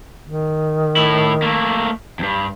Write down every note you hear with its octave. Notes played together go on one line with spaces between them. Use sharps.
D#3
A2 E4
A3 A#3
E2 G2